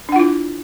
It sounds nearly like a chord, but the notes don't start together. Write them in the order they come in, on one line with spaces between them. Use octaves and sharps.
D4 F#5 F4 E4